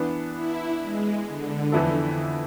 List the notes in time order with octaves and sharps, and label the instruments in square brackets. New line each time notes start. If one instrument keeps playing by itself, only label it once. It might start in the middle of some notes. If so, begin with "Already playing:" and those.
Already playing: [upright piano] E3 B3 D4
[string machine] E4
G#3
D3
[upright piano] F2 E3 B3 E4 A4